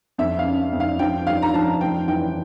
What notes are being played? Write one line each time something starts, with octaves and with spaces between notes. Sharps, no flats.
F2 E5
F5
C#3
F2
F5
F3 G5
G2 F5
A#5
F3 A5
F1 G5
E3 G5